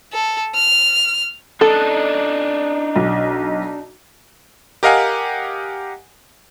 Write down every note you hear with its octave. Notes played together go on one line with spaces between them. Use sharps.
A4
F6
D4 D#4 A4
B1
G4 A#4 D#5 F5 F#5 G#5